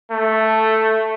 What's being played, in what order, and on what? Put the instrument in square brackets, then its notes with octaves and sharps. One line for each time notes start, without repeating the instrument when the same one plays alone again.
[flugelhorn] A3